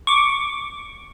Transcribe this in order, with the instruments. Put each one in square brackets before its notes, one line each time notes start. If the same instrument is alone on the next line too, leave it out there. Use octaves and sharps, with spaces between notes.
[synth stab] C#6 D6